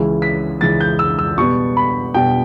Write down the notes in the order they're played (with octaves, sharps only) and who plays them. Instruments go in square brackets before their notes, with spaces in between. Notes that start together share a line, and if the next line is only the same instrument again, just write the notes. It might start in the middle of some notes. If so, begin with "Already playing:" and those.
Already playing: [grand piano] C#2 C#3 E3
B6
C#2 C#3 E3 A6
G6
E6
E6
B2 G3 B3 C#6
B5
B2 G3 B3 G5